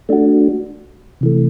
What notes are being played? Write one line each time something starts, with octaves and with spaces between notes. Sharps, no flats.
A3 D4 F#4
C3 E3 A3